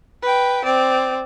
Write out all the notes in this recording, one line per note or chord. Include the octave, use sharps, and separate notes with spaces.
B4 G5
C4 D5